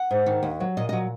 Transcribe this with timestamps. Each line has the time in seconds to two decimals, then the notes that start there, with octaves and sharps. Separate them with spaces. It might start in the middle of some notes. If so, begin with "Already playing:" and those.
Already playing: F#5
0.11 G#2
0.26 D#3
0.43 D#2
0.60 F#3
0.77 A#2 D#5
0.89 D#5
0.93 F#3